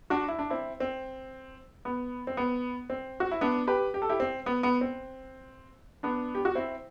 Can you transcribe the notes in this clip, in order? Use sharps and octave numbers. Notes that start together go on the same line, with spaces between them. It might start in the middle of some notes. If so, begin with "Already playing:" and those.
D4 F#4
E4
D4
C4 E4
C4
B3
C4
B3
C4
F#4
E4
B3 D4
G4 B4
G4
A4
E4 G4
C4
B3
B3
C4
B3 D4
G4
F#4
C4 E4